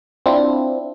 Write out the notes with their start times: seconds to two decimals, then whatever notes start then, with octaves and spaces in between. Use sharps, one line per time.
0.26 C4 D4 E4 F4